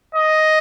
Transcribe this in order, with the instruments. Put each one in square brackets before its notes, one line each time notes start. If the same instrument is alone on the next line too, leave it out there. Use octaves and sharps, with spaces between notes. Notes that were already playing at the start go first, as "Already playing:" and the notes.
[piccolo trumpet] D#5